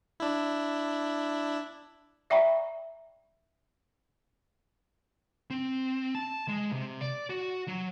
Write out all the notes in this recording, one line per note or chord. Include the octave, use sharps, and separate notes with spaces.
D4 E4
D5 E5 G5 A#5 B5 C#6
C4
A5
G#3
C3
D5
F#4
F#3